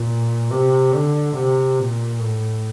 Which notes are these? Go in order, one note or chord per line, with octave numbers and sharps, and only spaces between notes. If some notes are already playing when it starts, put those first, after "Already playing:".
Already playing: A#2
C3
D3
C3
A#2
A2